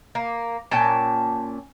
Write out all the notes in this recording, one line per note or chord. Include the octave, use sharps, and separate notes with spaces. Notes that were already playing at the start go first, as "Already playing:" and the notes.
A#3
A#2 C#4 G5 A5